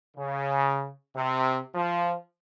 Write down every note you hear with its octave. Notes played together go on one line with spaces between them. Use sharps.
C#3
C3
F3